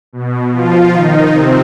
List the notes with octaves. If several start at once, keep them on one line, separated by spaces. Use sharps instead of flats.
B2
F3 F4
D#3 D#4
C3 C4